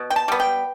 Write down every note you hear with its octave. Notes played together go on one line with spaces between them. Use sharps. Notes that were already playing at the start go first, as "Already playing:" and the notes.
Already playing: B2
G5
A5
G3 B3
G5